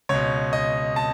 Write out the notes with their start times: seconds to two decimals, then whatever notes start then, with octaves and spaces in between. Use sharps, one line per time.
0.09 C#2 B2 C#5
0.53 D#5
0.96 A5